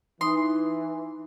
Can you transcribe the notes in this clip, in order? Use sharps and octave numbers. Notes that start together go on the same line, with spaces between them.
E3 D#4 C6 D#6